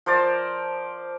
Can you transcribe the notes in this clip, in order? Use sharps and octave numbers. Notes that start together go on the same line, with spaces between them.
F3 A#4 C5 D5